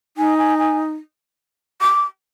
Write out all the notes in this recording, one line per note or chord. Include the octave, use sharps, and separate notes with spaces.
D#4 G#5
G#5
G#5
D6